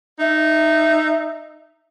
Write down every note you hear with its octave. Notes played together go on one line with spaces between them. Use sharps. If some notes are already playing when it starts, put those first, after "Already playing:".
D#4 E5